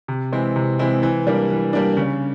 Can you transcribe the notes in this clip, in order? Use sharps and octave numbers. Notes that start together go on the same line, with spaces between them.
C3
E3 G#3 C4 E4
C3
E3 G#3 C4 E4
E3
G3 A#3 D4
E3
G3 A#3 D4
C#3